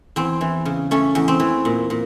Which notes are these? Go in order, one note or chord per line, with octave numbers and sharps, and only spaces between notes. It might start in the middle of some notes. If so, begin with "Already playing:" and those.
E2 C4
E3
C#3
A3 C#4
E2
C4
E3
A#2
A#2